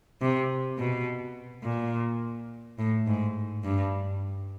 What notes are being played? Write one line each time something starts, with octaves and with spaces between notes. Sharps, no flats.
C3
B2
A#2
A2
G#2
G2